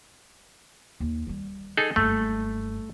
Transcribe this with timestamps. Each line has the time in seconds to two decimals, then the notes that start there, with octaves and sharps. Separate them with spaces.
1.00 D#2
1.27 D#3 G3
1.77 D#4 G#4 A4
1.96 F#1 G2 A3